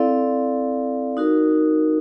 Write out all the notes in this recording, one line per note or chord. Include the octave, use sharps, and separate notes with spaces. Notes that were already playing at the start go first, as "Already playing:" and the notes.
Already playing: C4 E4 A4 D5 F5
D#4 F#4 A#4